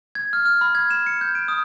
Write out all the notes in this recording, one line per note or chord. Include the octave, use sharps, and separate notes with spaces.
G#6
F6
F6
B5
G#6
E7
C#7
G6
D7
D#6